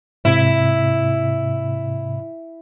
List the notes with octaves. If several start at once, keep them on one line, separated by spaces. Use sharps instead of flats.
G#2 C3 E4